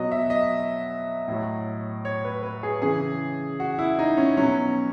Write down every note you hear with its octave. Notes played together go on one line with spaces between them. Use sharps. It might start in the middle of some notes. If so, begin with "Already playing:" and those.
Already playing: B2 F#3 D#5
E5
D#5
A2 F#3
C#5
B4
B4
G#4
C#3 E3 G#4
F#4
E4
D#4
C#4
B2 F#3 C#4